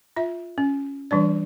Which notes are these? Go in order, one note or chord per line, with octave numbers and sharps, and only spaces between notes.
F4 E5
C#4
E3 G3 D4 D5